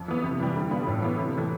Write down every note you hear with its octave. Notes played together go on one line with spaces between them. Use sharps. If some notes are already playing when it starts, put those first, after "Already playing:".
Already playing: F2
E3 B3
C3
E3 G3
D3
G3 B3 F4
A2
E3 B3
C3
E3 A3